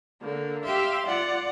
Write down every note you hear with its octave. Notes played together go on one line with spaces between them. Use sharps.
D3 A#3
G4 E5 F5 C6
F4 D5 F#5